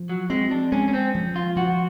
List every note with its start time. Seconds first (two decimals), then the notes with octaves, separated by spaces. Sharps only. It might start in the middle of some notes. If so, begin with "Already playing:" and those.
Already playing: F3
0.09 F#3
0.30 G#3 C4
0.51 D4
0.72 G#3 C#4
0.88 C#4
0.93 C4
1.15 F3
1.36 F4
1.56 F3 F#4